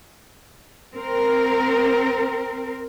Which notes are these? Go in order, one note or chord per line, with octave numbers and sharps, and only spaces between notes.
C4 A#4